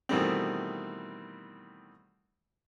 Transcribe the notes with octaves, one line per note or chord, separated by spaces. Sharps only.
B2 D#3 E3 G3 A3 C4